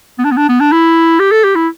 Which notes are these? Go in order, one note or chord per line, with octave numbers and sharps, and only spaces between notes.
B3
D4
B3
D4
B3
D4
E4
G4
A4
G4
E4